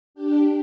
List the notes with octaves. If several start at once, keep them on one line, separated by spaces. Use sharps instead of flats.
D4 G4